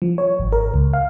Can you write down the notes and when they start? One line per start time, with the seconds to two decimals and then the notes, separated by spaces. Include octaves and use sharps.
0.02 F3
0.18 C#5
0.39 G#1
0.52 A#4
0.74 C#2
0.93 F5